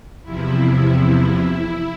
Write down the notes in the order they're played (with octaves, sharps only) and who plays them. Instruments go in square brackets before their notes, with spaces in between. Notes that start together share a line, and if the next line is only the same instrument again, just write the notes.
[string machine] E2 C3 F3 E4